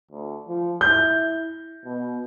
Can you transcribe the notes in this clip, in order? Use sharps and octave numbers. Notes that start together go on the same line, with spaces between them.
D2
F3
E4 G6
B2